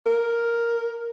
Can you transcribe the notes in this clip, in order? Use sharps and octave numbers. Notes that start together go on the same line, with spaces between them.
A#4